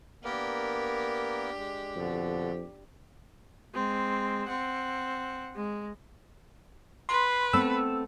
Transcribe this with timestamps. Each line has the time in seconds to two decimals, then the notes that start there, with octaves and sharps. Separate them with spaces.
0.24 A#3 B3 D4 G4 A#4
1.57 G#3
1.96 F2 B2 D3
3.74 G#3 C4
4.49 C4 F#5
5.55 G#3
7.09 B4 C6
7.53 A3 B3 C4 E6